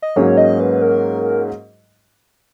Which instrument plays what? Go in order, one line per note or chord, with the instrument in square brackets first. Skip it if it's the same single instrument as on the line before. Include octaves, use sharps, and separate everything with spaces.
[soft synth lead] D#5
[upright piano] G#2 F#3 A#3 C#4 [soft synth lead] C#5
[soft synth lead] D#5
B4
A#4